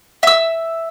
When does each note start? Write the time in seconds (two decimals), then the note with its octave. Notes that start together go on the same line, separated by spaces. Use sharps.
0.23 E5 E6